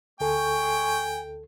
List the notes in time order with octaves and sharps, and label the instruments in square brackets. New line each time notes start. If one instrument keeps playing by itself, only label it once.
[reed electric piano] D2 A4 [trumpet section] G#3 C#6 [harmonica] G5 [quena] G#5